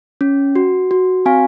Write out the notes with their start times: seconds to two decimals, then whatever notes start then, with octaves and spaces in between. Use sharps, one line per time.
0.21 C#4
0.55 F#4
0.91 F#4
1.26 C4 F5 G#5